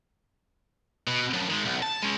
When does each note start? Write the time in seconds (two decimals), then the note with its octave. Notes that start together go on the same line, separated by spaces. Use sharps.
1.07 B2
1.34 F#2 F3
1.50 D#3 G#3
1.66 B1
1.83 A5
2.03 G#3 C#4